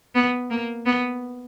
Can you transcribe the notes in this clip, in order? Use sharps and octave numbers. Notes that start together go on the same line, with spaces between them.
B3
A#3
B3